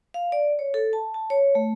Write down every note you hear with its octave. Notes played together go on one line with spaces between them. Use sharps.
F5
D5
C#5
A4
A5
A5
C#5
A3